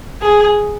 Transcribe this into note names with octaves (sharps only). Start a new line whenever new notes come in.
G#4